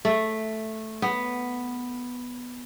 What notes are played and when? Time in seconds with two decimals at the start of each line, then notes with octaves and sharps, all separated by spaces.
0.05 A3
1.02 B3